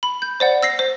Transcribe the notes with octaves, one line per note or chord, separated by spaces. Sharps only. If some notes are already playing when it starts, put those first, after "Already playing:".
B5
G6
C5 D5 F#5
E6 A#6 C7
C5